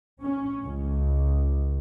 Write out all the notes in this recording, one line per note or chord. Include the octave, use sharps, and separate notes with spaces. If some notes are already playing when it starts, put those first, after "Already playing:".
C#4
C#2